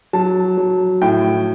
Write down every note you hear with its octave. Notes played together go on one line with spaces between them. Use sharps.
F#3 A5
F#3
A2 G5